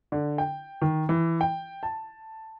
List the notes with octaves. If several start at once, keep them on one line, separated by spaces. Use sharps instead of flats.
D3
G5
D#3
E3
G5
A5